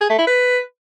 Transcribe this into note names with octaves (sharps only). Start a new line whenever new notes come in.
G#4
A3
E4
B4